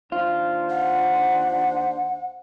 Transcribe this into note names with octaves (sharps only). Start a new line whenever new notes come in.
D#2 D4 F4 C5
F#5